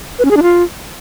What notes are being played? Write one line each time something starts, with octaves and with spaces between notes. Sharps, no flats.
B4
C#4
G#4
D4
F4